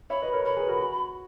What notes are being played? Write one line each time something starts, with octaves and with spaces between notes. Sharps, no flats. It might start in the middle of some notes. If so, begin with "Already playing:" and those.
C#5 E5 B5
B4 D#5
A#4 C#5
A#4 C#5 B5
G#4 B4
F#4 A#4
F#4